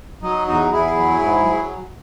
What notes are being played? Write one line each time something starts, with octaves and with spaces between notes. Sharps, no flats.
F#3 D#4
E2 D#4 F#4
E2 E4 G#4
F#3
G#2
F#3